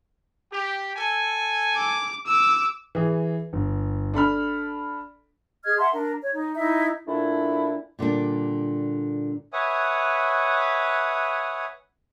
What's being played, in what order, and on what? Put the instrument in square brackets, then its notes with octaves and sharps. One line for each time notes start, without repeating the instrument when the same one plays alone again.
[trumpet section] G4
A4 G#5
[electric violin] D6
D6 E6
[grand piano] E3 G#4
G1
D4 A4 B5 F6
[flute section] G#4 D#5 F6 G#6
E5 F#5 A5 C6
D4 A#4
C#5
D#4
D#4 E4 D#5 E5
[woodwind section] A#2 A3 D4 E4
[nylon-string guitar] A#2 D3 G3 D4
[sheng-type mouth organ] B4 C#5 E5 F#5 G#5 D#6